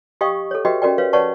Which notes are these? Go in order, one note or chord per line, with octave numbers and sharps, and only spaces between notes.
G4 D#5 F5 G5 C#6 D#6
A4 C#5
F#4 G4 B4 D#5 E5 G5
C#4 F#4 A#4 D5 G5
B4 C#5 F5
B4 C#5 D5 F#5 A5 C#6